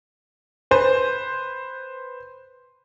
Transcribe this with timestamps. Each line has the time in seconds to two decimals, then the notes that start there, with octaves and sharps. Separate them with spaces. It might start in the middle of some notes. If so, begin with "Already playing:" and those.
0.71 B4 C5